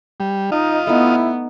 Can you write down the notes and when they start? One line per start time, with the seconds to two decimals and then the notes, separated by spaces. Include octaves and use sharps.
0.20 G3
0.52 D#4 F4 D#5
0.87 A3 B3 D#4 E4 D5